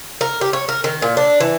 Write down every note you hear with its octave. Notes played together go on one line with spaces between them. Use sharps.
A#4
G4
C#5
A#4
D#3
A#2
D4
E3